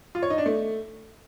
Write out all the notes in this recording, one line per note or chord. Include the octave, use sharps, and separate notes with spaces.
F4
C#5
D#4
D4
A3